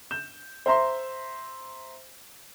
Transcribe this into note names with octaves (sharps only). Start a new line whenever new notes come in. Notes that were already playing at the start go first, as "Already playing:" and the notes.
G6 E7
C5 E5 A#5 C6